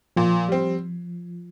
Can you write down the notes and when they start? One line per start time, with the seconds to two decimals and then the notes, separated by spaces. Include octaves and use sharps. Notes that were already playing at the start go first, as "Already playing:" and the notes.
0.16 A#2 F3
0.48 G3 C4